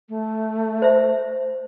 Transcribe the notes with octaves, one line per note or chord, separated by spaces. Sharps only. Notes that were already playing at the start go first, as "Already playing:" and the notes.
A3
C5 E5